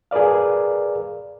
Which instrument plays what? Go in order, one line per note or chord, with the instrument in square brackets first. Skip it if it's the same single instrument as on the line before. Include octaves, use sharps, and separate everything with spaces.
[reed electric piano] G#4 A#4 B4 D5 F5